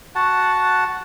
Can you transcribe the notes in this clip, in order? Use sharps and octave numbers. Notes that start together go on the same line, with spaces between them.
F#4 F#5 A5